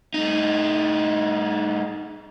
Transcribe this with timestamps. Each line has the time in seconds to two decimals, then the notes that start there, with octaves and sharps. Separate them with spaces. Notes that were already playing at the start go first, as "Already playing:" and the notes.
0.14 A2 D#4